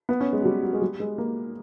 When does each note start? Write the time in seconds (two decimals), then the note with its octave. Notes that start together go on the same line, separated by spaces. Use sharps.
0.09 B3
0.20 C#4
0.33 G#3
0.41 F#3
0.45 G3
0.63 F#3
0.73 G#3
0.82 G3
1.00 G#3
1.18 A#3